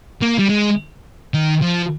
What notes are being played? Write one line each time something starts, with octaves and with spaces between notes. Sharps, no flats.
A#3
G3
G#3
D#3
F3